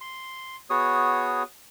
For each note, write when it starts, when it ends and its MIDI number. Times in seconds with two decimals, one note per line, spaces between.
0.01 0.56 84
0.70 1.43 59
0.70 1.43 66
0.70 1.43 68
0.70 1.43 73
0.70 1.43 87